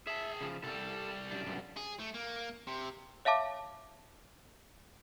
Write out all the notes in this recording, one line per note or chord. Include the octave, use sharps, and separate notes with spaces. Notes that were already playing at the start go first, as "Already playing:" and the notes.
G#4 E5 A5
C#3 F3
C2 G3 A4
F#2 D4
B1 G2
G#4
A3
A#3
C3
C#5 E5 F5 A5 D6